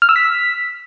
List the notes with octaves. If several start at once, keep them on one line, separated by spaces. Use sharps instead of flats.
F6
E6
B6